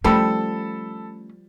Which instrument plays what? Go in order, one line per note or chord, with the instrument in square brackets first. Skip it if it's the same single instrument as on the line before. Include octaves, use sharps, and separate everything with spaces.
[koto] F3 G3 [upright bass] A3 C#4 [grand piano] A4 B5 E6